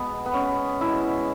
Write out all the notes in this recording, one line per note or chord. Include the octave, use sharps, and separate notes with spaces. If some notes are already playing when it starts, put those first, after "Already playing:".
Already playing: B2 G#3 B3
B3
C#4
B2 G#3 E4